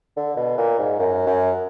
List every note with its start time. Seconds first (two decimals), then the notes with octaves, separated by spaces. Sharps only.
0.17 D3
0.37 B2
0.58 A#2
0.79 G#2
1.00 F#2
1.27 F#2